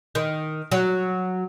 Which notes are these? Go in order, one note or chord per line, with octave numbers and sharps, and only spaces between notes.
D#3
F#3